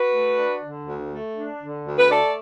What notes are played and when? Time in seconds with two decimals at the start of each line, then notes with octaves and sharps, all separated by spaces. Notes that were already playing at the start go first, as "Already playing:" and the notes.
Already playing: F#4 B4
0.11 A3
0.36 D4
0.61 D3
0.85 D2
1.11 A3
1.36 D4
1.60 D3
1.86 D2
1.99 B4
2.11 A3 A4 D5